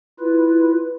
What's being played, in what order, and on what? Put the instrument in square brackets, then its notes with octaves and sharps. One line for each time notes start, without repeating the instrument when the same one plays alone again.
[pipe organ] E4 F4 B4